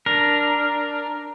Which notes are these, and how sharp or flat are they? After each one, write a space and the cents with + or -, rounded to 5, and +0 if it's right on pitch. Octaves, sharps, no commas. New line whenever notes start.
D4 +0 A#4 +0